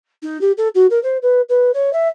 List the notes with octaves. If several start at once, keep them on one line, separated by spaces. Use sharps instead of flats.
D#4
G4
A4
F#4
A#4
C5
B4
B4
C#5
E5